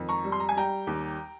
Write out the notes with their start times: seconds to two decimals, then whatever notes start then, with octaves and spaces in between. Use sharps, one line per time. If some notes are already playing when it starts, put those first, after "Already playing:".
Already playing: F2 D#3
0.09 A#5 C#6
0.24 G3
0.32 C6
0.40 A#5
0.49 G#5
0.56 G3 G5 A#5
0.87 D#2